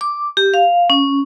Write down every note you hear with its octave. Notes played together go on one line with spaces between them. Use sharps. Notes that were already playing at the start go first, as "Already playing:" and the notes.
D6
G4
F5
C#4